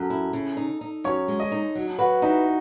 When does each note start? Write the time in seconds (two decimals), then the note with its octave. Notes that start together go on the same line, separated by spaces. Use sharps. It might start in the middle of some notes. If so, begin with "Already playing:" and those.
Already playing: F#2 A4
0.10 E4
0.33 C#3
0.57 D#4
0.81 D#4
1.04 F#2 C#5
1.28 G#3
1.40 D#5
1.52 D#4
1.75 F#3
1.99 F#4 B4
2.22 D#4 E4